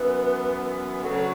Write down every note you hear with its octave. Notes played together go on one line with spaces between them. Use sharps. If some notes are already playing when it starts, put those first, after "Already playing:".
Already playing: F#2 E3 B3 B4
D2 C#3 F#3 A4